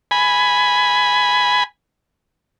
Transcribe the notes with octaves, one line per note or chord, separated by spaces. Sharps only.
G#5 B5